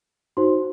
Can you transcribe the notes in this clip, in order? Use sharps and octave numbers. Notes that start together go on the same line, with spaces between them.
D#4 F#4 C5 C6